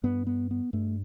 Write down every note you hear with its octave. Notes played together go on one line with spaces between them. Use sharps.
G2 B3
B3
B3
G2 A3